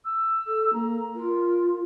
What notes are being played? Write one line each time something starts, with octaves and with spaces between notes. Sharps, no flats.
E6
A4
A#3 A#5
F4 A#4